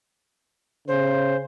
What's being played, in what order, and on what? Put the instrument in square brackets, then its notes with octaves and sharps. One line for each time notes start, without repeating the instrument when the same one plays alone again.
[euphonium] C#3 [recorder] C5